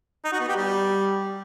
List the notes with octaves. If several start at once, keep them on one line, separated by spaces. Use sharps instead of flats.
D#4
F#4
B3
G4
G3